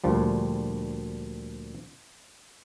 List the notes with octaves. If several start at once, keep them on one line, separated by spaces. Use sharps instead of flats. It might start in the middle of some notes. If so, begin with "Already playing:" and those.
D2 A#2 F3 G3